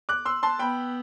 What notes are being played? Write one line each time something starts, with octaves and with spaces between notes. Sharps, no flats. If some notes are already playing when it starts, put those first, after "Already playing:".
D6 F#6
C6 E6
A5 C6
B3 G5 B5